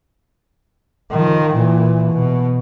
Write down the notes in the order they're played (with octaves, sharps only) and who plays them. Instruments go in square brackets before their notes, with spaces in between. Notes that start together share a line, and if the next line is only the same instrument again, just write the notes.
[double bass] D#3 F3
A#2 E3
B2